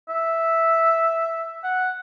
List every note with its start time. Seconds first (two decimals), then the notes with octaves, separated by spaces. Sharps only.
0.09 E5
1.64 F#5